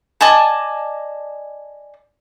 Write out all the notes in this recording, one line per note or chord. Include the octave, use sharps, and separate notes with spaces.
D5 D#5 G#5 A5